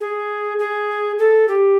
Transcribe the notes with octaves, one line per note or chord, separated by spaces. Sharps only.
G#4
G#4
A4
G4